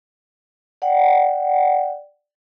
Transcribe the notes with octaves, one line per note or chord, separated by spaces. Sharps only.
D5 F#5 G5